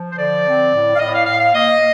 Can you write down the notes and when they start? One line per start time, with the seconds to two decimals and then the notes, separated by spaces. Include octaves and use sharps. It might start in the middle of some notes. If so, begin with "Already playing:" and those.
Already playing: F3
0.12 C5
0.18 D3 D5
0.47 C4
0.73 A2
0.95 F5
0.99 A2 D#5
1.14 F5
1.26 A2 F5
1.40 F5
1.54 A#3 D#5